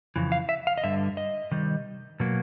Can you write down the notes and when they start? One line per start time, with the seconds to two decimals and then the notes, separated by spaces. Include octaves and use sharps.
0.16 F2 C#3 E3
0.32 F5
0.49 E5
0.67 F5
0.78 D#5
0.84 G2 D3 G3 E5
1.17 D#5
1.51 C3 D#3 G3
2.20 B2 F#3 A#3